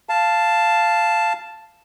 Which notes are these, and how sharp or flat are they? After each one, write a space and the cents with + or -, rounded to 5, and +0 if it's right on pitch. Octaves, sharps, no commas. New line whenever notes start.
F5 -10 A5 +0